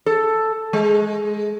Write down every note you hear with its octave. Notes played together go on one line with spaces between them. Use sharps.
A4
G#3